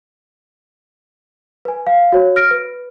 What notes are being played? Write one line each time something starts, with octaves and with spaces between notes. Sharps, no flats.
B4 G#5
F5
F#4 C#5
F6 A#6 D7
B4